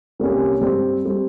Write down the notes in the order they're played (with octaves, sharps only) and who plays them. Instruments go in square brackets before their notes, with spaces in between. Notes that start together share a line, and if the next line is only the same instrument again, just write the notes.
[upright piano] C2 C3 G3 A#3 C#4
G2 G3 C4
G3 C4